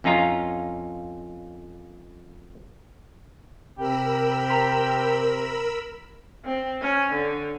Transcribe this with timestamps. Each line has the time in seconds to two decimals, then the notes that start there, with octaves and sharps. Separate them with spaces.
0.04 F2 C#4 D#4 F4 A#5
3.78 C3 G4 A#4 B5 E6
4.49 A#5 C6 B6
6.45 C4
6.82 C#4
7.12 D3